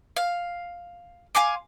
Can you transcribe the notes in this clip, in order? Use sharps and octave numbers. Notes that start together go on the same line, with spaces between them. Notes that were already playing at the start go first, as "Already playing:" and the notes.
F5
F5 G#5 C6 D6